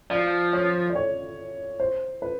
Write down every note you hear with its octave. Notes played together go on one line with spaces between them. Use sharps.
F3 D5
C#5
D5
C#5
C5
B4